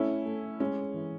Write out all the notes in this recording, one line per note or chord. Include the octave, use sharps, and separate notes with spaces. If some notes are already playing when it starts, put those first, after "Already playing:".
Already playing: A3 C#4 E4
A3
G#3 C#4
E3